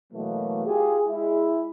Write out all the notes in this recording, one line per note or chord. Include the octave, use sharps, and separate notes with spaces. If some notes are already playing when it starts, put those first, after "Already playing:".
B2 E3 F#3 A3 A#3
F4 G4 G#4
G#3 E4